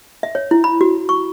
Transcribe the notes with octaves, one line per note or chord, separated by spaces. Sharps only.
E5
C#5
E4
B5
F#4
C#6